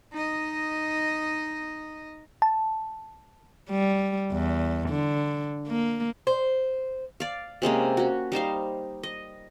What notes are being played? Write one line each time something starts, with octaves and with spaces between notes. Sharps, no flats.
D#4 D#5
A5
G3
E2
D3
A#3
C5
D5 F5
C3 G#3 A#3 C#4
C#4 F#4
G3 D#4 C5 F5
D#5